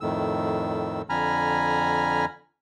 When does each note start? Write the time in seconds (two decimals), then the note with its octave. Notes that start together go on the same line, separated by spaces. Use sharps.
0.01 F2 A2 D#3 E6
1.10 F2 D3 G#5 A#5 B5 F6